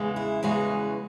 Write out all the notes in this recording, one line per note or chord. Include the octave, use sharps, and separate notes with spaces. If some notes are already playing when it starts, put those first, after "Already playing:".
Already playing: E2 C#3 E3 G#3
E4
E2 C#3 E3 G#3 F#4